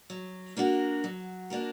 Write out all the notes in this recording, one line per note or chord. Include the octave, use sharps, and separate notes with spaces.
F#3
A#3 D4 F#4 A#4
F#3
A#3 D4 F#4 A#4